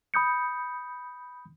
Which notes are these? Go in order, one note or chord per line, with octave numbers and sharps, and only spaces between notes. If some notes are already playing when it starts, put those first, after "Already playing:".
B5 D#6 G6 C#7